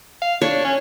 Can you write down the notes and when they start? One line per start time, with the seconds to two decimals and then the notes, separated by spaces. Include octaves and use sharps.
0.22 F5
0.42 D4 C#5
0.64 C#4